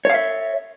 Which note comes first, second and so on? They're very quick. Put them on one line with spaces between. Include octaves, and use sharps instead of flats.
C#5 F5 E5